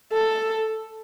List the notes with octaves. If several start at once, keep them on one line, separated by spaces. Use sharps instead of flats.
A4